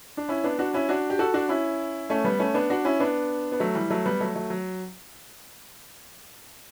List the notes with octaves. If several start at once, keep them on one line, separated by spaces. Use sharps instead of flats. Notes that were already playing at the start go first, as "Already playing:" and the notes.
D4
C#4 E4
B3 D4
D4 F#4
C#4 E4
D4 F#4
G4
F#4 A4
D4 F#4
C#4 E4
A3 C#4
G3 B3
A3 C#4
B3 D4
D4 F#4
C#4 E4
B3 D4
B3
F#3 A3
E3 G3
F#3 A3
G3 B3
F#3 A3
F#3 A3
F#3